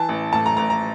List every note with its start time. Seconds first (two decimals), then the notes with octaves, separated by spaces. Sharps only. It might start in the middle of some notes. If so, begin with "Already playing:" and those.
Already playing: E3 A5
0.09 A1
0.33 A2 A5
0.46 A#5
0.57 A1 A#5
0.70 A#5